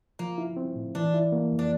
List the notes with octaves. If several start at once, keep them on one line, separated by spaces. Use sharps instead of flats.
F3 A#3
E4
C4
A2
E3 D4
E4
A#3
F2
D4